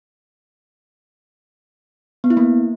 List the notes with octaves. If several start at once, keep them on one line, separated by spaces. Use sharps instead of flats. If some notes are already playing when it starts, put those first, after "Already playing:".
B3
E4
A#3